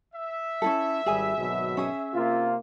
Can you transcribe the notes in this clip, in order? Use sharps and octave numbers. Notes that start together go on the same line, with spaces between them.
E5
C#4 E4 A4
G#1 G3 G#4 G#5
G#1 B2 F#3
C#4 G#4
C3 A#3 F4